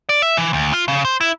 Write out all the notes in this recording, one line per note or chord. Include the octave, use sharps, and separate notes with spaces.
D5
E5
E3
D2
F4
C#3
C5
E4